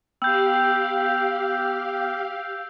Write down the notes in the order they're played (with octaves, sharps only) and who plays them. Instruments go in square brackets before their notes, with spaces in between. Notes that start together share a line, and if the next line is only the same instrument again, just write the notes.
[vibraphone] B3 G5 [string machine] G4 F5 [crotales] E6 G6